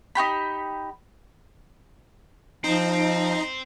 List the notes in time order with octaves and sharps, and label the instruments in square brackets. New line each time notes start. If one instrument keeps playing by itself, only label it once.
[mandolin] D#4 F4 G4 B5
[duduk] F3 [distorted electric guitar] C4 [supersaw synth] D#4 A#5